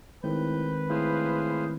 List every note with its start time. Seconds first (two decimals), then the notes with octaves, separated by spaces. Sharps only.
0.24 A2 D#3 G#3 C4 B4 G6
0.90 A2 G#4 C5 F5